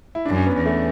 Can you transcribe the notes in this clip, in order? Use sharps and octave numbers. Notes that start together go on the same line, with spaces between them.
E4
F#2 D4
C#4
B3
E2
A3